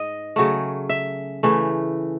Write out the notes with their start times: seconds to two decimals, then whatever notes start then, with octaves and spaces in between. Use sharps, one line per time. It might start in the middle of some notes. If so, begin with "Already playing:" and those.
Already playing: G#2 D#5
0.36 C#3 F#3 A3
0.89 E5
1.43 C#3 E3 A3